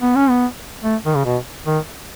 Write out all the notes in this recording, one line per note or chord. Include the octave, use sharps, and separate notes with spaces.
B3
C#4
B3
A3
D#3
C#3
B2
D#3